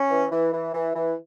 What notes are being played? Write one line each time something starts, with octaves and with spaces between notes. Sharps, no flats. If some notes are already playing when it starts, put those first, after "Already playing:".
Already playing: C#4
E3
E3
E3
E3
E3